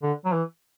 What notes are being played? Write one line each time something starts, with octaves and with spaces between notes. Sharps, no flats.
D3
F#3
E3